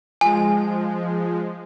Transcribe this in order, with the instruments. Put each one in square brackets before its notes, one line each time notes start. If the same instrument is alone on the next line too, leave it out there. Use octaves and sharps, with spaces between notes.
[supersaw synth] F3 G#3 [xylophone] G#5